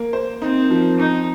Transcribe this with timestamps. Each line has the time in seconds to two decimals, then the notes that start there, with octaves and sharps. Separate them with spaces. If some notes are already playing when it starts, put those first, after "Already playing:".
Already playing: A#3
0.13 C5
0.42 C4 D#4
0.70 F3
0.99 C4 D#4